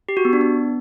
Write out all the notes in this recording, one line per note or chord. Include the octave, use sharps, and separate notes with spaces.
G4
F#4
B3
D4
B3